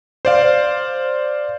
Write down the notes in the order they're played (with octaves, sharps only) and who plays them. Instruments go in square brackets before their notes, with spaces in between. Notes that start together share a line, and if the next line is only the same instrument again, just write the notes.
[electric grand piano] C5 D5 F5